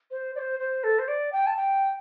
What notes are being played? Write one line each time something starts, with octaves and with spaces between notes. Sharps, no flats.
C5
D5
C5
C5
A4
C5
D5
G5
A5
G5